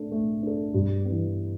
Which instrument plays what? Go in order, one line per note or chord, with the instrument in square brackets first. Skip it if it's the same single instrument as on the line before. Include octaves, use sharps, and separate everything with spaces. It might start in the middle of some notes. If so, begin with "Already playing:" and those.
Already playing: [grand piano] A3 D4 A4
A3
D4 A4
G2
B3
E3